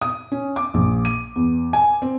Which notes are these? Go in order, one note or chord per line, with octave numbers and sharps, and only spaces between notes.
D#6
C#4
D6
A#1
D#7
E2
G#5
C4